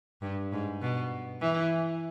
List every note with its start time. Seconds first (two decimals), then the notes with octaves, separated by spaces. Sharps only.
0.22 G2
0.53 G#2
0.82 B2
1.41 E3